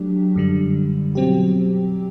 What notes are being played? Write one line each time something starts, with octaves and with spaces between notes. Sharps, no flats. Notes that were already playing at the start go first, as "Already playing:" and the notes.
Already playing: F#3 A3 D4 G4
F#2 D3 G3
B2 F#3 C4 G4